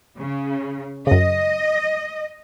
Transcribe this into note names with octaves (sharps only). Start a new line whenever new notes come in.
C#3
F#2 C#3 D#5